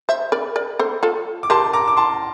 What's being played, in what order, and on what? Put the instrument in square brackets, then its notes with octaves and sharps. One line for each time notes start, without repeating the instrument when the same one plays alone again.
[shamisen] C5 E5
A#4 D5
A#4 D5
A4 C5
F4 A4
[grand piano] D6
[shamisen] G4 A#4 [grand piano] A5 C6
[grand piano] A#5 D6
D6
A5 C6